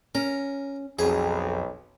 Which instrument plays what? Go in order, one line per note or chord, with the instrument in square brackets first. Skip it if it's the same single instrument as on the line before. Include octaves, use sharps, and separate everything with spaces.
[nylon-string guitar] C#4 [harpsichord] A#4
[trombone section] B1 [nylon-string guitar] F2 [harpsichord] G#4